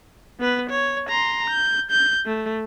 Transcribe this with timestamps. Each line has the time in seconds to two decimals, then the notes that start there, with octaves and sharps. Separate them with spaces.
0.40 B3 B4
0.70 C#5
1.09 A#5 C6
1.49 G6
1.91 G6
2.26 A3